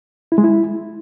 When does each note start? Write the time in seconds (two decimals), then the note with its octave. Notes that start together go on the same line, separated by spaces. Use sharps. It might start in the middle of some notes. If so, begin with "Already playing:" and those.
0.32 E4
0.38 G#3
0.44 E4